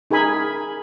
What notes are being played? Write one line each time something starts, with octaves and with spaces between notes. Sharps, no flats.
D#4 G#4 A#4 G#5 B5